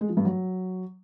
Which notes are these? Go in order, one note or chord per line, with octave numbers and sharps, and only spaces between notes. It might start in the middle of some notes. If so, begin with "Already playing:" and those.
G#3
F3
G2
F#3